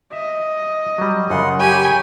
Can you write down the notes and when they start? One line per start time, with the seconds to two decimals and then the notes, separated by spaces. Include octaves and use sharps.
0.13 D#5 E5
0.98 F#3 G3
1.30 F#2 C#3 F4 F#5 C6
1.60 G4 C#5 G5 G#5 B5